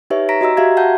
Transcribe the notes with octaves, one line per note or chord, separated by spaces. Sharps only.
D#4 G4 B4 C#5 E5
A#5 A#6 B6 D7
F#4 D#5 A#5 E6
F#4 G4 E5 F5 A#5 G#6
F5 F#5 A5 G6